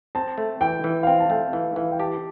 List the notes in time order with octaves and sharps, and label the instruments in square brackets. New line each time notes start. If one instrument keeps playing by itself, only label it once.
[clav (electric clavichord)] C4 [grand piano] A5
[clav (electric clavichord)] A3
[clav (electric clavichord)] E3 [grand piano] G5
[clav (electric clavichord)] E3
[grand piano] F5
[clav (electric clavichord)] C4 [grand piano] G5
[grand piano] A5
[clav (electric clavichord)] A3 [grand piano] G5
[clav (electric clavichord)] E3 [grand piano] F5
[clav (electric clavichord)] E3 [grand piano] F5
[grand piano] G5
[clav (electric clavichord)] G4 [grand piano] A5